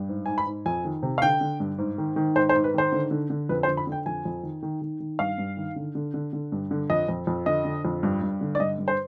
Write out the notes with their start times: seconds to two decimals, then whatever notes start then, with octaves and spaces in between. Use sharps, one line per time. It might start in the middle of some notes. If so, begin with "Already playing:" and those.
Already playing: G2
0.09 G#2
0.26 G#2 G#5
0.38 B5
0.46 G#2
0.66 F2 G#5
0.85 D#3
1.03 C3
1.18 F5
1.22 D3 G5
1.41 D3
1.60 G2
1.78 G#2
1.98 D#3
2.16 D#3
2.36 G#2 C5
2.49 C5
2.55 G#2
2.64 B4
2.74 D#3 C5
2.92 D3
3.11 D3
3.30 D3
3.49 F2 B4
3.63 C5
3.68 D3
3.77 B5
3.87 D3 G5
4.06 F2 G#5
4.25 F2
4.43 D#3
4.63 D#3
4.82 D#3
5.00 D#3
5.19 G2 F5
5.38 G2
5.57 D#3
5.76 D3
5.95 D3
6.14 D3
6.33 D3
6.52 G2
6.71 D3
6.90 F2 D#5
7.09 F2
7.27 F2
7.46 D3 D#5
7.65 D3
7.85 F2
8.03 G2
8.22 G2
8.41 D3
8.55 D5
8.59 G2 D#5
8.78 G2
8.88 C5